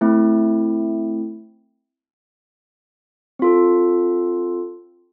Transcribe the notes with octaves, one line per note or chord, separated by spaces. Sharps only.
A3 C4 E4
C4 F4 A4